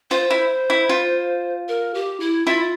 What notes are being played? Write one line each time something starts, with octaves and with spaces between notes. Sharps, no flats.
F4 C5
E4
E4
F4
A#4
G4
E4
E4 F4